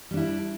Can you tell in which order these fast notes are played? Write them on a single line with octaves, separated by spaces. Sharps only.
G3 D4 E4